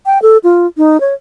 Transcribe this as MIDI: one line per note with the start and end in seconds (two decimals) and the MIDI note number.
0.06 0.21 79
0.22 0.38 69
0.44 0.67 65
0.77 1.00 63
1.01 1.14 73